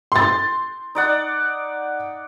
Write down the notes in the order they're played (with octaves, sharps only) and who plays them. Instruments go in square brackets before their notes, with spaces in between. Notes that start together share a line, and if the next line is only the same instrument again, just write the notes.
[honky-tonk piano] C6 A6
[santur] D#4 D5 F#5